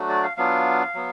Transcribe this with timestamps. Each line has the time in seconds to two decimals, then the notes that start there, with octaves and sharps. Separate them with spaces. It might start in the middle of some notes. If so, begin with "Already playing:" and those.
Already playing: F#3 A3 D4 F#4
0.09 D5
0.23 F5
0.37 F#3 B3 D4 F4 F5
0.94 F#3 B3